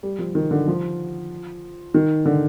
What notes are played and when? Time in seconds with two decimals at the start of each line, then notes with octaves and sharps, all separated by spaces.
0.03 G3
0.19 F3
0.35 D#3
0.51 D3
0.68 F3
1.94 D#3
2.25 D3